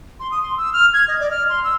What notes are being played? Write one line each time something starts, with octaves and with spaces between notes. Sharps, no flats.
C6
D#6
C6
E6
F6
G#6
D#5
D5
F6
C6
E6